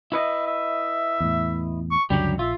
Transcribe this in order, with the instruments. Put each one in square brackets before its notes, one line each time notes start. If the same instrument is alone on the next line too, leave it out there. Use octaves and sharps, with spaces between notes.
[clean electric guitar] E4 B4 D#5 [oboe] E5
[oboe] E5
[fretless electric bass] E2 A2
[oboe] C#6
[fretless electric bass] C#2 F#2 D3 [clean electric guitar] F#3 G3 [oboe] G4
[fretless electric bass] A#1 [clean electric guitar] F4 [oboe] E5